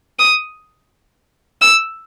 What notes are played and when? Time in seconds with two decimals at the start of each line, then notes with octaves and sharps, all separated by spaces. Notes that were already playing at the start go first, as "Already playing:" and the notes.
0.19 D#6
1.61 E6